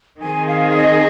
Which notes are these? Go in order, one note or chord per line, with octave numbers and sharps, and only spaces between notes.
D#3 C4 D#4 G#4 G#5
F5
F5
D#5